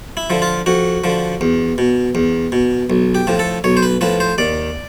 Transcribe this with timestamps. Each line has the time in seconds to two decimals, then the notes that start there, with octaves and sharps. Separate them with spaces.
0.17 E4
0.30 D3 F3
0.42 F4
0.66 F2 F#4
1.04 D3 F3
1.41 E2
1.78 B2
2.15 E2
2.52 B2
2.90 B1
3.15 G4
3.27 A2 F3
3.39 A4
3.64 B1 C#5
3.77 C5
3.83 B4
4.01 A2 F3 B4
4.20 C5
4.38 D#2 D5